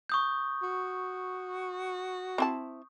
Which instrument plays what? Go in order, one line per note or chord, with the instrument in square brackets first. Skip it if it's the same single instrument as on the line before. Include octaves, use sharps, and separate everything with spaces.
[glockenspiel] C#6 D#6 G6
[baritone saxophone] F#4
[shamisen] C4 E4 A5